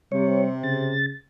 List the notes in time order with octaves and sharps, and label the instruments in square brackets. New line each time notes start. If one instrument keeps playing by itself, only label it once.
[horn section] C3 [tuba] G3 [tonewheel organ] C#5
[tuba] C#3 [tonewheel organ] A6